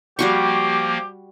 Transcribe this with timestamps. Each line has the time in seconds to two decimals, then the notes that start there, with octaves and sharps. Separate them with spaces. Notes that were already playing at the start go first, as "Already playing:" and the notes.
0.19 F3 G3 A#3 F#4 G4 C#6